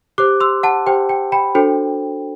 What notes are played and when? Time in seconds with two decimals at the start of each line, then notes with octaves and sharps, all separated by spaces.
0.18 G4 C5 D6 F#6
0.40 C6 E6
0.63 F#5 A5
0.86 G4 C5 G5
1.09 G5
1.32 G5 B5
1.55 D4 F#4 A4 C5 G5